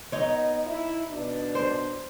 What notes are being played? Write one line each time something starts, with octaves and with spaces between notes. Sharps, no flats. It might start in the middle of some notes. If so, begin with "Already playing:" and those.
B3 D#4 C#5 D#5
E4
B2 D4
C5